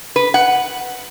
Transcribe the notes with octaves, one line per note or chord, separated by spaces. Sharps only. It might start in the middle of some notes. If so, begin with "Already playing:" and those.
B4
F#5